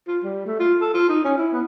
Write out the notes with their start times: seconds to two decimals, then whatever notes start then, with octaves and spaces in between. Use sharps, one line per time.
0.07 F4
0.23 G3
0.46 A3
0.59 F4
0.81 A4
0.94 F4
1.09 D#4
1.24 C#4
1.37 E4
1.53 B3